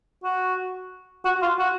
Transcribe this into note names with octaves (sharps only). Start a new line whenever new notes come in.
F#4
F#4
F4
F#4